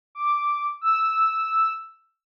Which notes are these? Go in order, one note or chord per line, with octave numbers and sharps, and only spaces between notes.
D6
E6